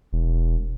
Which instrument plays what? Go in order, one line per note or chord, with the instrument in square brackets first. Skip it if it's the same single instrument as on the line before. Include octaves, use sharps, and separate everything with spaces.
[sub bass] E1